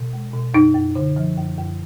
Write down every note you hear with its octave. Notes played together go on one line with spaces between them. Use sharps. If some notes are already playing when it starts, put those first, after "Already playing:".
Already playing: B2
G#3
B2
F#2 D#4
F#2
D3
F3
F#2
F#2